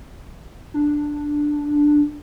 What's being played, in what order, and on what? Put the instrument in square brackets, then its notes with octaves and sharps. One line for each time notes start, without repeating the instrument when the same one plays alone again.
[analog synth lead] D4